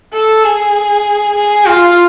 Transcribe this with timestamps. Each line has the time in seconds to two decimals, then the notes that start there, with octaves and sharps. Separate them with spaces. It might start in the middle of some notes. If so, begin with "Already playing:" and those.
0.14 A4
0.45 G#4
1.36 G#4
1.66 F4